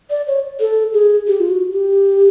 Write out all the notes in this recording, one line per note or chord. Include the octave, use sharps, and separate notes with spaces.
D5
C#5
A4
G#4
G4
F4
F#4
G4